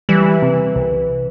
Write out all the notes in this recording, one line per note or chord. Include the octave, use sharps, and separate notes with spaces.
E3 G3
C3
C2